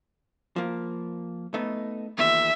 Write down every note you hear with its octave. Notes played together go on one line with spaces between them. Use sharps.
F3 A#3
A3 B3 D#4
E2 A#2 D#3 E5